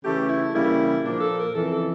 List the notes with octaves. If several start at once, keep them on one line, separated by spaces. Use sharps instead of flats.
C#3 E3 A3 G4
E4
C#3 E3 G3 A#3 E4
A#2 F3 A#3 D4
A4
A#4
F2 C#3 E3 A4
A4